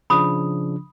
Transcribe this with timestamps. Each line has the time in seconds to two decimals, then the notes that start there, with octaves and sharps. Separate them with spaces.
0.10 C#3 F3 D4 B5 D#6